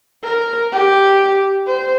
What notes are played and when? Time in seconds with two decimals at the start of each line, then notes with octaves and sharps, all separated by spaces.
0.24 A#4
0.72 G4
1.67 C5